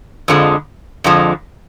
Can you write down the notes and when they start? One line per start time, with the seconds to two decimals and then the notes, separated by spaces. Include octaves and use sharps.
0.28 F2 D3 F3 G#3
1.04 F2 D3 F3 G#3